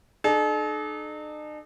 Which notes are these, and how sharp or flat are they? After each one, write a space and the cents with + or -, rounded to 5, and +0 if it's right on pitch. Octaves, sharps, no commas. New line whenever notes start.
D#4 -45 A4 -45